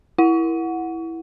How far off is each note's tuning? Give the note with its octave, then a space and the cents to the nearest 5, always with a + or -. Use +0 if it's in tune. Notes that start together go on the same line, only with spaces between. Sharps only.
E4 +0 F#5 -10